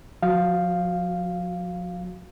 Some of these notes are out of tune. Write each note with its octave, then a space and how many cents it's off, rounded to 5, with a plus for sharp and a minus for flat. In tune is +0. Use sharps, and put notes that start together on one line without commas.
F3 +40 F#4 +0 F5 +0